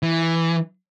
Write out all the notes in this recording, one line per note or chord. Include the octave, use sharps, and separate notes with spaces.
E3